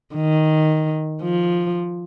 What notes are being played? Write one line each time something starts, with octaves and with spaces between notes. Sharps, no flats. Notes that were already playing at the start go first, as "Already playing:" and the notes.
D#3
F3